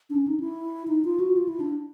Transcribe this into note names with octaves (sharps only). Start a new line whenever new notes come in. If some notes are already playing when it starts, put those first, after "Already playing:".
D4
C#4
D#4
E4
D#4
F4
F#4
F4
E4
D4